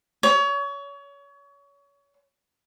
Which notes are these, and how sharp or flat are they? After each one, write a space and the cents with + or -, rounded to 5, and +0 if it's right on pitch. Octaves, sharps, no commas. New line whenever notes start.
C#5 +30